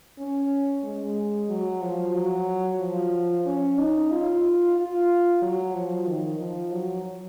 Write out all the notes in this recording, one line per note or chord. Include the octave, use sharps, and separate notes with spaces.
C#4
G#3
F#3
F3
F#3
F3
C#4
D#4
F4
F4
F#3
F3
D#3
F3
F#3